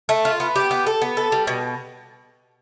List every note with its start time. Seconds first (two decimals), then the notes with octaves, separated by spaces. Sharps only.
0.09 A3
0.25 F4
0.40 B3
0.56 G4
0.71 B3
0.87 A4
1.02 B3
1.17 A4
1.32 G3
1.47 B2